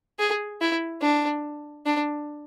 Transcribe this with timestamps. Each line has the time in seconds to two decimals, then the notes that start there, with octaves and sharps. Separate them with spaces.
0.19 G#4
0.61 E4
1.02 D4
1.86 D4